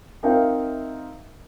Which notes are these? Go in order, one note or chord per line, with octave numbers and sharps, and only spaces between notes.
C4 D#4 A#4 E5 F5 G5